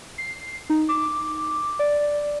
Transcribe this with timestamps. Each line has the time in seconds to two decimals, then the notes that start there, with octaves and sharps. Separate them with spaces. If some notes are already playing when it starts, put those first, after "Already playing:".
0.18 C7
0.70 D#4
0.89 D6
1.79 D5